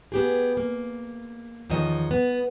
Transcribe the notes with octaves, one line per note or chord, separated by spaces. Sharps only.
B3 G4 G#4
A#3
E2 D#3 F3 C#5 D#5
B3